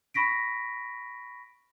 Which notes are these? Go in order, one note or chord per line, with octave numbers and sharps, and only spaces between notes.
B5 C#6 A#6 B6 D7